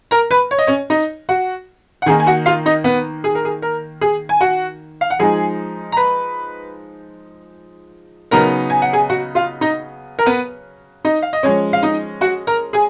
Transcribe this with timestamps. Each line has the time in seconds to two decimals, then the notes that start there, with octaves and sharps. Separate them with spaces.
0.11 A#4 A#5
0.31 B4 B5
0.51 C#5
0.59 D#5
0.67 C#4 C#5
0.90 D#4 D#5
1.29 F#4 F#5
2.02 F#5
2.06 D#3 A#3 D#4 G#4 G#5
2.20 G#5
2.27 F#4 F#5
2.46 F4 F5
2.66 D#4 D#5
2.84 B3 B4
3.24 G#4
3.35 A#4
3.45 G#4
3.62 A#4
4.01 G#4
4.29 G#5
4.40 F#4 F#5
5.01 F5
5.10 F#5
5.19 F3 G#3 D#4 G#4 G#5
5.92 A#5
5.97 B4 B5
8.31 C#3 F#3 B3 D#4 A#4 A#5
8.70 G#5
8.82 F#5
8.93 G#4 G#5
9.10 F#4 F#5
9.35 F4 F5
9.61 D#4 D#5
10.19 A#4
10.26 B3 B4
11.05 D#4 D#5
11.22 F5
11.33 D#5
11.43 F3 G#3 C#4 C#5
11.73 F5
11.83 D#4 D#5
12.21 F#4 F#5
12.47 A#4 A#5
12.73 G#4 G#5